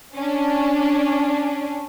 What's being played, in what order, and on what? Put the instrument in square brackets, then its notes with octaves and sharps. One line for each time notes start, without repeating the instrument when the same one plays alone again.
[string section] C#4 D4